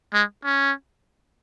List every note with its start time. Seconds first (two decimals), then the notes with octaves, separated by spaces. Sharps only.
0.14 G#3
0.44 C#4